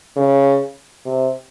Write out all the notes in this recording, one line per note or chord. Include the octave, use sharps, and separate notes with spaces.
C#3
C3